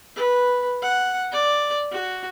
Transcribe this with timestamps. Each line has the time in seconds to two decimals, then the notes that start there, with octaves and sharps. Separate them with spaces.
0.16 B4
0.83 F#5
1.32 D5
1.92 F#4